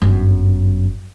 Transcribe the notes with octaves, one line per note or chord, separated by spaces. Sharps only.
G1 F#2